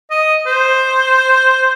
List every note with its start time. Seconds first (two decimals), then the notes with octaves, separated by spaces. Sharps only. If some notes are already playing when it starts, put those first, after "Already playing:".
0.10 D#5
0.46 C5